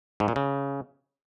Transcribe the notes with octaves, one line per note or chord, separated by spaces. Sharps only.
G#2
A#2
C#3